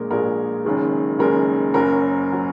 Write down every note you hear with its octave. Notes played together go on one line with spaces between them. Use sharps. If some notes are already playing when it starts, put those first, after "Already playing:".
Already playing: A#1 A#2 G#3 A#4
A#1 A#2 G#3 A#4
F#1 F#2 D#3 G#3
F#1 F#2 D#3 G#3 A#4
F#1 F#2 F#3 A#4
F#3